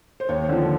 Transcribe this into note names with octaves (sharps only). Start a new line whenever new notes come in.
C5
D#2 C#5
D3 F3